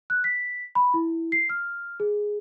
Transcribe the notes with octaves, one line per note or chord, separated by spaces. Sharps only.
F#6
B6
B5
E4
C7
F6
G#4